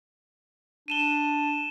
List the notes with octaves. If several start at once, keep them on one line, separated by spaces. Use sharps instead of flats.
D4 D#7 E7 G7